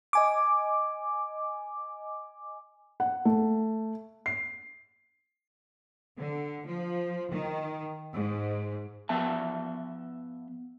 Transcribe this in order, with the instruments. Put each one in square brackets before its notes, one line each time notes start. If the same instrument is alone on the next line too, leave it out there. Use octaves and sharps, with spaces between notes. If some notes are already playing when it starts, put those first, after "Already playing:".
[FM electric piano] D#5 G#5 D6
[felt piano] F#5
A3
C7
[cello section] D3
F3
D#3
G#2
[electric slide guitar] F3 B3 E5 A5